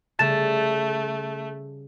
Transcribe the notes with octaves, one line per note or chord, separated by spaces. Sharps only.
C#3 G3 A3 A5 A6 E7